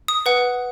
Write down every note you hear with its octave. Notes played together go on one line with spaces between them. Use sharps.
D#6
B4 F#5